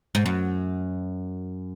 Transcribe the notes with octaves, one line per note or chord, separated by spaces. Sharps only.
G#2
F#2